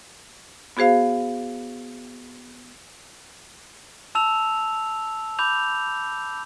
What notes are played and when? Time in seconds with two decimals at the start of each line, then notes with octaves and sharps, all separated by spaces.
0.77 B3 F#4 G#4 C5 F5
4.15 A5 E6 F7
5.39 B5 D6 G6 F7